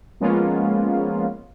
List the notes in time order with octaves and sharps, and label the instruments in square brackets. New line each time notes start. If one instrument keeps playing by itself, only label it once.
[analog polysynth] F3 G#3 A#3 B3 C#4 F4